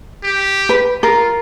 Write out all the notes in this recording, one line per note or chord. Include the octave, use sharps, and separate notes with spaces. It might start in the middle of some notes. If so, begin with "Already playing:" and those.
G4
B4
F4 A#4